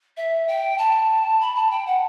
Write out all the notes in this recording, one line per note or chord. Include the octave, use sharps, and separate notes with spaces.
E5
G5
A5
B5
A5
G5
F#5